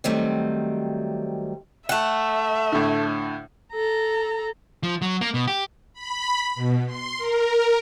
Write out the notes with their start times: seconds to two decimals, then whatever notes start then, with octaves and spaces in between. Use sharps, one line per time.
0.04 D#3 F#3 G3 A3 C4
1.89 A3 E5 F#5
2.72 A2 D3
3.73 A4 A#5
4.83 F3
5.02 F#3
5.21 A#3
5.34 B2
5.48 G4
5.93 B5
6.55 B2
6.86 C6
7.18 A#4